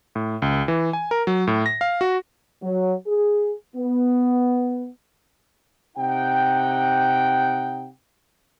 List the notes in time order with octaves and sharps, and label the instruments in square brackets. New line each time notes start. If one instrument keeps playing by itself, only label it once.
[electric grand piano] A2
C#2
E3
G#5
A#4
F#3
A2
A#6
F5
F#4
[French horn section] F#3
G#4
B3
[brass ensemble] C3 D#4 F#5 G5